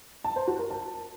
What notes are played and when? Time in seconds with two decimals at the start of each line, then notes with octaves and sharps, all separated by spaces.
0.24 A5
0.36 C5
0.47 F#4
0.59 A#4
0.71 A5